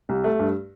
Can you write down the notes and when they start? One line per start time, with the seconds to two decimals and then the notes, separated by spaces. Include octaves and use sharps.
0.09 C2
0.24 A3
0.39 G2